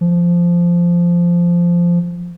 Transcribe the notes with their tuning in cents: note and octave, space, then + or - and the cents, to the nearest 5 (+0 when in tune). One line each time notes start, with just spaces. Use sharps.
F3 -10